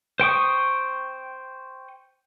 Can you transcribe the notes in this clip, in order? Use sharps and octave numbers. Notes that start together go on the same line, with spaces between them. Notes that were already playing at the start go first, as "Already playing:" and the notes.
C5 G5 C#6 D#6